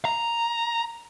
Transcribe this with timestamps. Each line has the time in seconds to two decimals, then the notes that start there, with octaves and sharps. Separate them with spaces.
0.05 A#5